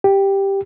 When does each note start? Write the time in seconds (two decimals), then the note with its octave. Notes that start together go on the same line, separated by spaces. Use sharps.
0.04 G4